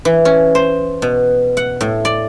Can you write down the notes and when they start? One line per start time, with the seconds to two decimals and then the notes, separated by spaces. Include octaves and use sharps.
0.05 E3
0.25 C#4
0.55 C5
1.02 B2
1.57 F#5
1.81 A2
2.05 D5